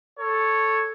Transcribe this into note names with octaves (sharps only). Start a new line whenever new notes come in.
A4 C#5